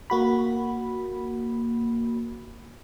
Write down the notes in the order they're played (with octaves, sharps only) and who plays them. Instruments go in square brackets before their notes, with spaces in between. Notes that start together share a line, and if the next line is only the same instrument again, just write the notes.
[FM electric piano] A#3 F#4 B5